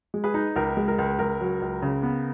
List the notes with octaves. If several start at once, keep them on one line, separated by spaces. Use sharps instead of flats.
G#3
G#4 B4
D#4
C#2 A#4
G#3
A#4
C#2
C#2 A#4
F#3
C#2
C#3
B3